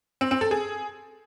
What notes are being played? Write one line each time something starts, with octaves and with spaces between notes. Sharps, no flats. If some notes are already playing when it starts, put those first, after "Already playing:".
C4
C4
A4
G#4